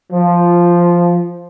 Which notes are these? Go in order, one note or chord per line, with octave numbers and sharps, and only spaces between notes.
F3